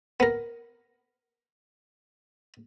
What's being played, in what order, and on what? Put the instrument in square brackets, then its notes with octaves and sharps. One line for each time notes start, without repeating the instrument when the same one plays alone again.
[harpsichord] B3 A#4